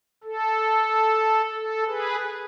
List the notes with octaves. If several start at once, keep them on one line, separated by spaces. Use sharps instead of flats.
A4
A4
G#4 B4